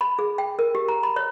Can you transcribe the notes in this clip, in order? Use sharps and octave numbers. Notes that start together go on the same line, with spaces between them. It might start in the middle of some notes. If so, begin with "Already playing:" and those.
B5
G#4
G5
A#4
G4
A#5
B5
C#5